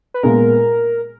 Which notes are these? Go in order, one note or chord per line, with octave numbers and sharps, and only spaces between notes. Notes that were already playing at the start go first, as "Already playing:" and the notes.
B4
A#2 G#3 B3 A#4